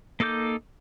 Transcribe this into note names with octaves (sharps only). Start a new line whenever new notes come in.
A#3 D#4 A4 D6 G6